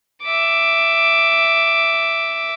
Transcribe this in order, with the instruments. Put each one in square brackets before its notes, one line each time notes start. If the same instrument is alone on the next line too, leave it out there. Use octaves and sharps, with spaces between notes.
[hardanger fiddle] E5 D6